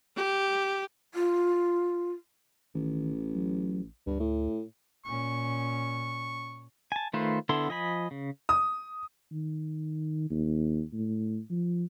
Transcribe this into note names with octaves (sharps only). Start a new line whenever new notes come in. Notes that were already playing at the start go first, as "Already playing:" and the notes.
G4
F4
A1 D#3
F#3
D2 G2
A2
A#2 C#4 C#6
G#5 A5
D#3 A3 F4 B4 C5
D3 B3 E4 A4 C6
F3 D#5 G#5 B5
C#3
D#6
D#3
D#2
A2
F3